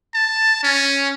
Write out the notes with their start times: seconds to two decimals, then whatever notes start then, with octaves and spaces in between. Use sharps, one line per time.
0.14 A5
0.63 C#4